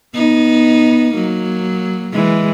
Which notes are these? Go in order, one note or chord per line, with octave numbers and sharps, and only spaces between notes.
B3 D#4
F#3 A#3
E3 G#3